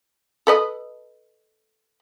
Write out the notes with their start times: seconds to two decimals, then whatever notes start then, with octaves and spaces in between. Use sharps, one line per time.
0.47 A4 B4 D#5